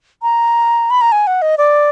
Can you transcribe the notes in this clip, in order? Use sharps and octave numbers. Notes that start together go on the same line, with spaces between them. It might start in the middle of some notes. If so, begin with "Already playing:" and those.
A#5
B5
A#5
G#5
F#5
D#5
D5